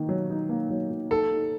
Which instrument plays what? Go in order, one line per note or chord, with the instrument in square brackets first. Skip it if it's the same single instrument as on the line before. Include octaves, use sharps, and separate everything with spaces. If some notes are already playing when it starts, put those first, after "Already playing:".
Already playing: [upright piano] D#3 A#3 D#4
F#3
D#4
A#3
F#3
F#3
[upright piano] D#4 [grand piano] A4
[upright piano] D#4